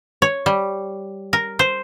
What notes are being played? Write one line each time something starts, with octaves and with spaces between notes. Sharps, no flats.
C#5
G3
A#4
C5